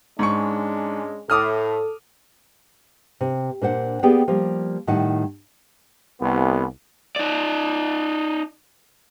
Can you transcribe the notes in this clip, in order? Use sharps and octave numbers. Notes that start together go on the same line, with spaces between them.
G#2 G#3 C#4 D4 C#6
A2 A4 D6 D#6 F6
C3
A#2 D4 C5 F#5
A#3 B3 G4 G#4 D5 G5
F3 G3 A#3
A2 D#3 G3 F#5 A5
C2 B3
D#4 D5